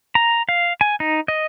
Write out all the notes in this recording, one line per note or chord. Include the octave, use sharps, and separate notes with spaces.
A#5
F5
G#5
D#4
D#5